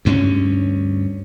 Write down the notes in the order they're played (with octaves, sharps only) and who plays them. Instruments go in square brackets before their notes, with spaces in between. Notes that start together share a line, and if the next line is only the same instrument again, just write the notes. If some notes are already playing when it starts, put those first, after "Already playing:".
[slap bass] D2 G2 B3 C#4